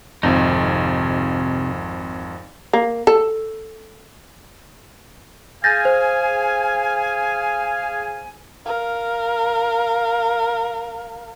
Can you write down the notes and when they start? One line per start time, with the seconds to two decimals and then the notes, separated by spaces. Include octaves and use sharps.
0.23 G#1 F2 C3 D#4
2.73 A#3
3.07 A4
5.64 G#4 F5 G#5 G6 A6 A#6
5.85 C5
8.66 A#4 F5